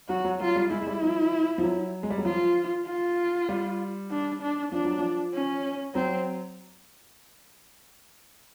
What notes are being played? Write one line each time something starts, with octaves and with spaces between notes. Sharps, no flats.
F#3 F#4
F#3
F#3 F4
G3
G#3 E4
G#3
G3
F3
F3
F#3
G#3
G3
F#3
F3 F4
F4
G3
D4
D4
F3 D4
F#3
F3
C#4
F#3 C4